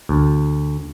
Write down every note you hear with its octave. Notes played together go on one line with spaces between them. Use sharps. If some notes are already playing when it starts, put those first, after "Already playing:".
D2